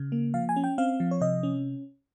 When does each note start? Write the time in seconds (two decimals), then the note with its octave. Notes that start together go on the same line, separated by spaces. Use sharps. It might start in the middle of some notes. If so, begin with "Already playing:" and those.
Already playing: C#3
0.12 A#3
0.34 F3 F5
0.49 G#5
0.56 C#4
0.64 G5
0.78 C4 F5
1.00 F3
1.11 C#5
1.21 C3 D#5
1.43 C#4